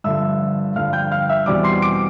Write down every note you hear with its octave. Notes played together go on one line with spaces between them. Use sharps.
G2 D3 F3 E5 E6
G2 D3 F3 F5 F6
G5 G6
F5 F6
E5 E6
E2 B2 G3 C4 D5 D6
C6 C7
D6 D7